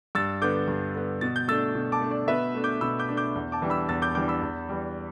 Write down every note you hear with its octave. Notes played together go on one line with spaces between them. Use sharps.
G2 E6 A6
D3 B3 D6 G6
G2
D3 B3
B2 A6
G6
A3 D4 E6 A6
B2
A5 D6
A3 D4
D5
B2 B4 E5
A3 D4
D6 G6
B2 B5 E6
D6 G6
A3 D4
D6 G6
E2
A5 D6
E3 G3 D4
B5 E6
E2 E6 A6
D6 G6
E3 G3 D4 D6 G6
B5 E6
E2
E3 G3